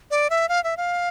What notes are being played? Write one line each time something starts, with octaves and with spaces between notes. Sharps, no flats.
D5
E5
F5
E5
F5